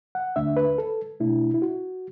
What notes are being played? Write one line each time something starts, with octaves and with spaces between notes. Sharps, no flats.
F#5
D2 D3 A3 D4 E5
B4
A4
B2 A3 D4 E4
E4
F#4